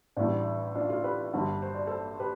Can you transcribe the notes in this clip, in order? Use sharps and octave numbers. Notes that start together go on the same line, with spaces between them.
A1 A2 G3 D4
D4 F4
F4 A4
G4 B4
G1 G2 D3 G3
C5
D5
A4 C5
G4 B4